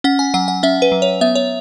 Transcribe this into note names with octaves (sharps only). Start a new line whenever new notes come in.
C#4 F#5
G#5
F#3 F#5
F#5
C#4 E5
B4
F#3
C#5
B3 E5
C#5